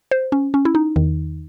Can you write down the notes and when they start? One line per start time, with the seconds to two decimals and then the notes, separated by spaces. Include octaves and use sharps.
0.11 C5
0.32 C#4
0.54 C#4
0.65 E4
0.75 D#4
0.96 E2 D#3